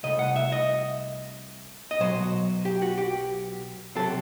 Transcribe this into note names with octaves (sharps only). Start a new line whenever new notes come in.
C2 C3 A3 D#5
F#5
E5
D#5
D#5
B1 B2 F#3 B3 C5
G4
F#4
G4
C3 F#3 C4 A4